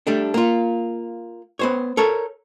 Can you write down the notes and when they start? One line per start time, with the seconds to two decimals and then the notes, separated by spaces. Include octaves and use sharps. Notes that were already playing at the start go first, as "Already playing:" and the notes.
0.07 G3 A3 D4
0.34 A#3 F4
1.59 B3 C5 C#5
1.97 A4 A#4 C#5